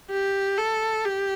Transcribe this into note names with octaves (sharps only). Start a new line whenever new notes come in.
G4
A4
G4